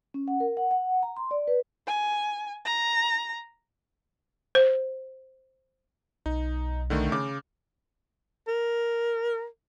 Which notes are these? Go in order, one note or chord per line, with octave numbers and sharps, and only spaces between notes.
C#4
F#5
A#4
F#5
F#5
A#5
C6
D5
B4
G#5
A#5
C5
B1 D#4
D3 D#3 A3
C#3 D6
A#4